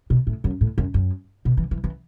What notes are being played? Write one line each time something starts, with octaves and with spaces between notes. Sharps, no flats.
B2
A2
F#2
A2
F#2
F#2
B2
E3
E3
E3